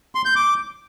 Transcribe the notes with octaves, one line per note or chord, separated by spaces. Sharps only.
C6
G6
D6